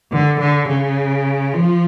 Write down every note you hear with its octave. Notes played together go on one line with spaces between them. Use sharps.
D3
D3
C#3
F3